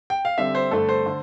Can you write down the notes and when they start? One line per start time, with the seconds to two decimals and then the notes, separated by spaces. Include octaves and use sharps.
0.10 G5
0.25 F5
0.38 D3 G3 C4 E5
0.55 C5
0.71 G2 D3 A3 A4
0.89 C5
1.06 D3